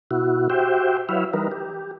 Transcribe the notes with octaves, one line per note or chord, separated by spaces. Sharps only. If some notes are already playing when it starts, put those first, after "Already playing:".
B2 E4 F#4
F#4 G4 C5 E5 G5
F#3 E4 B4 C#5 E5 F5
E3 G3 D#4 A#4 B4
G4